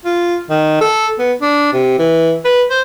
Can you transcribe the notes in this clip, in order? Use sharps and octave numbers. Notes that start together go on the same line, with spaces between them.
F4
D#3
A4
B3
D4
C3
E3
B4
C5